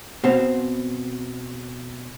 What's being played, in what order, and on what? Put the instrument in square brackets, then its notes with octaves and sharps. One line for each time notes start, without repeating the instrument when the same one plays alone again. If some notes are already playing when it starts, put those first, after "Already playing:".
[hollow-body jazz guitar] B2 C4 F5